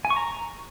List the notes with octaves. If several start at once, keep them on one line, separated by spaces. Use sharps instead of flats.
G#5
C#6
A#5